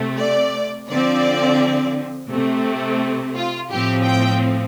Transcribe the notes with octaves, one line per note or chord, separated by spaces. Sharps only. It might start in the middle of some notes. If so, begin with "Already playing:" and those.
Already playing: C3 A3 C4
D5
D3 F3 C4 D5
C3 A3 C4
F4
A2 F3 C4 G4
G5